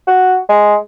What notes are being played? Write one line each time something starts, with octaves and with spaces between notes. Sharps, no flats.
F#4
G#3